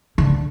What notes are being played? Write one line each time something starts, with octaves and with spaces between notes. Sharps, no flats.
D3